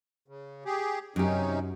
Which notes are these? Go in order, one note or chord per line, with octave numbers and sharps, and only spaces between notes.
C#3
G4 G#4
F#2 C3 C#4 D#4 G4